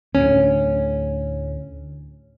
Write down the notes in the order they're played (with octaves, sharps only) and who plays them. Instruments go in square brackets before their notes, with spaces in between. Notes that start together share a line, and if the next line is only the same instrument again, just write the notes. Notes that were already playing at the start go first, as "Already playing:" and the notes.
[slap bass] D2 A2 [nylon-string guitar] C#4